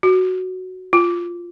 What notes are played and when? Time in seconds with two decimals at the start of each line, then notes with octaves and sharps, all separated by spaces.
0.03 F#4
0.93 F4